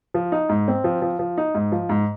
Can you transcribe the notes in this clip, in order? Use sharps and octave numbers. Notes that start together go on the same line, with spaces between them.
F3
D#4
G#2
C4
F3
F3
F3
D#4
G#2
F3
G#2